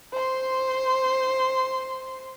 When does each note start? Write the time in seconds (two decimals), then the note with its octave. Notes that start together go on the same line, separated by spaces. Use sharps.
0.13 C5 C6